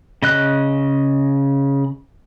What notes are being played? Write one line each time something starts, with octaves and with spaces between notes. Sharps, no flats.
C#3 D#5 F#6